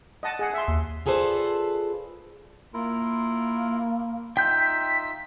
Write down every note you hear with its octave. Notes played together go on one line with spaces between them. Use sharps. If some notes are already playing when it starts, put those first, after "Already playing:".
D#5 F#5 A5
G#4 F#5
E5 C6
D#2
F4 G#4 A4 B4 C5 D5
A#3 E4 F4 A#4
D#4 F4 E5 G5 G6 B6